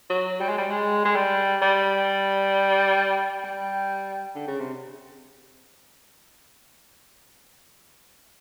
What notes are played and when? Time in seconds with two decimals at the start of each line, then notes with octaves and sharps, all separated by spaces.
0.10 F#3
0.40 G3
0.49 G#3
0.58 G3
0.71 G#3
1.05 G#3
1.16 G3
1.62 G3
3.44 G3
4.35 D3
4.47 C#3
4.60 C3